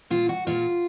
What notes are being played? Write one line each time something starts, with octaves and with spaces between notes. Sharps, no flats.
A#2 F4
F#4
A#2 F4